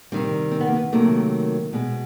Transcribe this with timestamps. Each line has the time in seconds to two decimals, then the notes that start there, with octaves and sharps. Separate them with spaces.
0.12 C3 D#3 G3 C4
0.52 C4
0.60 B3
0.68 A#3
0.76 B3
0.92 C3 D#3 F#3 A3 A#3
1.73 B2 G#3